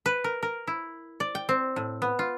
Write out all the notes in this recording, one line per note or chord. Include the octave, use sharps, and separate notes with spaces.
B4
A#4
A#4
E4
D5
G5
C4
A2
B3
F4